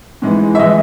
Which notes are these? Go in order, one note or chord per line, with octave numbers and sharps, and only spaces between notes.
G#2 E3 G#3
E5
E3 G#3 D#5